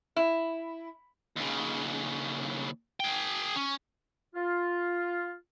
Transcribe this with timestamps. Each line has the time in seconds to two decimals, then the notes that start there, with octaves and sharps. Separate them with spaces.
0.16 E4
1.36 D#2 C#3
3.00 G#4 G5
3.56 C#4
4.34 F4